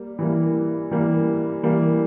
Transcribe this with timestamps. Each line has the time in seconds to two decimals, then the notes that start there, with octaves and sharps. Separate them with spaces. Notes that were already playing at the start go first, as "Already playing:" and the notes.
Already playing: G3 A#3
0.19 E3 G3 A#3
0.91 E3 G3 A#3
1.63 E3 G3 A#3